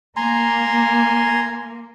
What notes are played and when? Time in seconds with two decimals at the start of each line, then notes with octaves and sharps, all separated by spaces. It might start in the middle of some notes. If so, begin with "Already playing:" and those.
0.16 A#3 G#5 A#5 C6